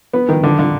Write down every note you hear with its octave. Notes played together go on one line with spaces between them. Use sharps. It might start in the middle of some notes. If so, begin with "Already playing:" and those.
B3
D#3
D3
D3